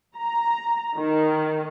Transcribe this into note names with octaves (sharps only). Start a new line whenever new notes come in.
A#5
D#3